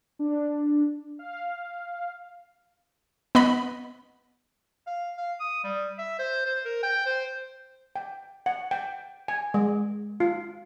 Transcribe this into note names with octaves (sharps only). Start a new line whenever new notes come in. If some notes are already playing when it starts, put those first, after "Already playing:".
D4
F5
B3 D#5 B5
F5
F5
D#6
G3
E5
C5
C5
A#4
G5
C5
G5
F#5
G5
G#5
G#3
F4